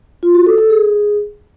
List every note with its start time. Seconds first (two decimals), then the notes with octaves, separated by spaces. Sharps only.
0.23 F4
0.35 F#4
0.46 A4
0.58 A4
0.70 G#4